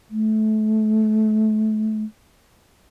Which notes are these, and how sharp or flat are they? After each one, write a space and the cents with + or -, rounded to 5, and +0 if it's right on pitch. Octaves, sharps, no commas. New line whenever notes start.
A3 -25